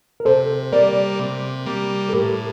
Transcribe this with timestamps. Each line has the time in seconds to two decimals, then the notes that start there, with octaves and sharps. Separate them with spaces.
0.20 A#4
0.25 C3 A4 C5
0.72 G3 A#3 A#4 D5
1.19 C3
1.66 G3 A#3
2.09 A4
2.13 A2 G4 A#4